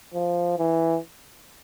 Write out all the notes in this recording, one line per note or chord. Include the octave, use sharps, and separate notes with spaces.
F3
E3